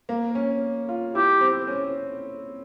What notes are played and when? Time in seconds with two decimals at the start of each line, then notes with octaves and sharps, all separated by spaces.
0.09 A#3
0.35 C#4
0.89 F4
1.15 E4 G4
1.41 C4
1.68 C#4